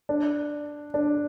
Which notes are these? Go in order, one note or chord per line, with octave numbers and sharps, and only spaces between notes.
D4
D4